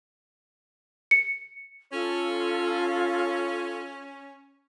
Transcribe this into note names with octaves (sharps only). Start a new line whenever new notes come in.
C#7
C#4 F4 A4